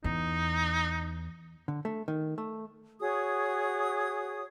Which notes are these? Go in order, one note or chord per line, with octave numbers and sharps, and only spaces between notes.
E2 D#4
D3
A3
D#3
A3
F#4 G#4 C#5 D#6